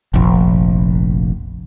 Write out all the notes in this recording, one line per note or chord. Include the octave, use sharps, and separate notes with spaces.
F1 A#1